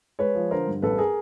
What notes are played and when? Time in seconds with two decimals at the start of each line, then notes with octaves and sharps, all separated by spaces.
0.19 G#3 B4 C#5
0.35 F3
0.51 D3 A#4 C5
0.67 G2
0.82 A1 A4 B4
0.98 G#4 A#4